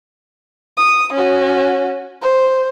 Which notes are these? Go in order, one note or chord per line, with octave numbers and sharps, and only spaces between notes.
D#6
C#4 F#4
C5